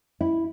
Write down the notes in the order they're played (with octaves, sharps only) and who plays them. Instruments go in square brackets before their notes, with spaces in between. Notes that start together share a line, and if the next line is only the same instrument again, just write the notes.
[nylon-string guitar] E4